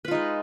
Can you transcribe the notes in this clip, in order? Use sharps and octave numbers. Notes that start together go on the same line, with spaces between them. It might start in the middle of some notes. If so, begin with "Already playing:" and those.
G#3 D#4 F4 B4